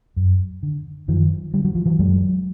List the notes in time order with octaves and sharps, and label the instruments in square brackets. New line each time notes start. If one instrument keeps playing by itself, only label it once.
[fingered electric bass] F#2
D3
F#2 D#3 F3
D3 G3
F#3
F3
E3 F#3
F#2 F#3 G#3